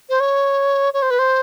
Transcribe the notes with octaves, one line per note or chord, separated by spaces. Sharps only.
C5
C#5
C#5
C5
B4
C5